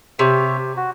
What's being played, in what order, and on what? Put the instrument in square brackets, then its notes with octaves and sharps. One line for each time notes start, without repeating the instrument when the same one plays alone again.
[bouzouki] C3 [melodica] G4 C#5 E5
[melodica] F#4